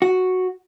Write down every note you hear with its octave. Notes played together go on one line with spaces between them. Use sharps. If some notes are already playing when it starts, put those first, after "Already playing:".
F#4